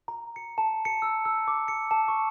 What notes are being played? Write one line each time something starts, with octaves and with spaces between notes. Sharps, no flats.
A#5
C#7
A5
C#7
E6
E6
D6
C#7
A5
C#6